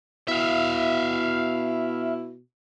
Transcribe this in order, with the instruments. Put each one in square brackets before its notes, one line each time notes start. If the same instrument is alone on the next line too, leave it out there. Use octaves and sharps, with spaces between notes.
[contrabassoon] B2 [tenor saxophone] E4 [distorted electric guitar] E5 F5